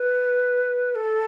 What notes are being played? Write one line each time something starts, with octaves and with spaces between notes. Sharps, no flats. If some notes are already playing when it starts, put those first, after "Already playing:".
Already playing: B4
A4